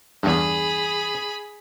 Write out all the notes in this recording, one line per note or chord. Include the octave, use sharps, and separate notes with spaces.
E2 G2 G#4 B5